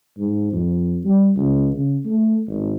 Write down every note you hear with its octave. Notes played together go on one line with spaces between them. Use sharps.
G#2
F2
G3
C#2
C#3
A3
G#1